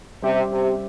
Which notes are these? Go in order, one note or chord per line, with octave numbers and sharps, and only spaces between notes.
C3 G3 C#4 G4 C5 E5
C3